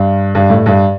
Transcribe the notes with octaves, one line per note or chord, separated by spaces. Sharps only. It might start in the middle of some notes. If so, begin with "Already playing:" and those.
Already playing: G2
G2
A2
G2